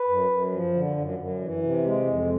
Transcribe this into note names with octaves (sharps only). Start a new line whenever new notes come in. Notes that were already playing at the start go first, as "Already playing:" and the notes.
Already playing: B4
F#2
F#2
F3
D3
F#2
F#2
E3
C3
G#3
F2